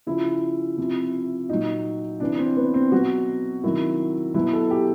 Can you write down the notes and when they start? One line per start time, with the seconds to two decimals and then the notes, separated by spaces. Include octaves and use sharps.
0.07 C#3 F3 E4
0.77 C3 F3
1.49 A#2 F#3 D#4
2.20 C3 E3 D4
2.38 C4
2.57 B3
2.74 C4
2.92 B2 F#3 F#4
3.64 C3 D#3 F#3 E4
4.34 B2 F#3 E4
4.53 A4
4.71 G4